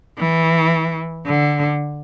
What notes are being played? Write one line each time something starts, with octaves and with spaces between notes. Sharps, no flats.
E3
D3